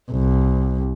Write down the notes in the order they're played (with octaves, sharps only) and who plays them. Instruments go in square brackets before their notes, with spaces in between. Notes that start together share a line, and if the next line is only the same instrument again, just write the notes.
[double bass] C2